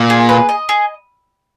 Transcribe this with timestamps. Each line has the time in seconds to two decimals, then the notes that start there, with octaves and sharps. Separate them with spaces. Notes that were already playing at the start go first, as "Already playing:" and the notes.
Already playing: A#2
0.10 G#4
0.29 B4
0.49 D#5
0.69 G#4